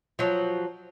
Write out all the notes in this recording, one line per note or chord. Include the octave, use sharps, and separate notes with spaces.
F3 F#3